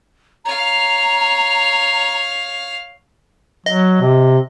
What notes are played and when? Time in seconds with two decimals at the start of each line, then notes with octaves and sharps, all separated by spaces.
0.45 C#5 F5 A#5
3.66 F#3 D#5
4.01 C3